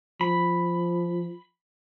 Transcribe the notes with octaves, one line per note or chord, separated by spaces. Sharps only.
F3 B5